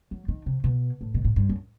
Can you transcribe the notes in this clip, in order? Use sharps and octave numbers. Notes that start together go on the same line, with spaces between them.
F#3
D#3
C3
B2
A2
B2
A2
G2
F#2